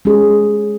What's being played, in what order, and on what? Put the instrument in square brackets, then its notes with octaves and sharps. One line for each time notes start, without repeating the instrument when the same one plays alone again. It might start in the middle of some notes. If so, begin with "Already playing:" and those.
[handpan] G#3 C#4 G#4